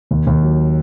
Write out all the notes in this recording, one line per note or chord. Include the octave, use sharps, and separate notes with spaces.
D#2
D#2
F#3